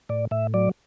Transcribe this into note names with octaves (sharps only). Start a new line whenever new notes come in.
A2 D5
A2 E5
F#3 D5